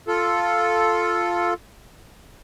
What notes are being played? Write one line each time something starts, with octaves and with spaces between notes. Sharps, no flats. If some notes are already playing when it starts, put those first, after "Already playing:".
F4 A4